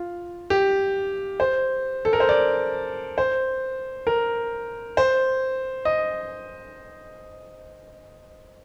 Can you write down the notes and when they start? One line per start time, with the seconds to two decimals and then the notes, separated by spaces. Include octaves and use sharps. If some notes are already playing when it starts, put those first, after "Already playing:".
Already playing: F4
0.50 G4
1.40 C5
2.05 A4
2.13 A#4
2.20 C5
2.29 D5
3.18 C5
4.07 A#4
4.97 C5
5.85 D#5